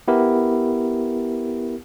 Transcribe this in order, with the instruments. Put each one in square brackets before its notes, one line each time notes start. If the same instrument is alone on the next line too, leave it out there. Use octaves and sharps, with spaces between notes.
[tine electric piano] B3 E4 G4 A#4